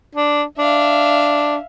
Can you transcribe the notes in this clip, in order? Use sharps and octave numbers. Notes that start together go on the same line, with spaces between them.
D4
D4 E5 F5